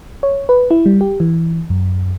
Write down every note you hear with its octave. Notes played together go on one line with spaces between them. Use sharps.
C#5
B4
E4
G3
G4
E3
F#2